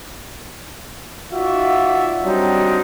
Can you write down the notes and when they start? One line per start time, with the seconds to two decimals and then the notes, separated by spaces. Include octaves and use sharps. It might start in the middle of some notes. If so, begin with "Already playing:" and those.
1.33 D#4 F4 F#4 D5 E5
2.23 F#3 G3 C4 D4 D#4